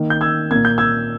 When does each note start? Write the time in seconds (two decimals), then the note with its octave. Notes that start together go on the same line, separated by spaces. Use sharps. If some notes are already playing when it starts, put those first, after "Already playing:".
Already playing: D#3 A#3
0.10 G6
0.21 E6 G#6
0.51 A#2 A#3 G#6
0.65 G6
0.78 E6 G#6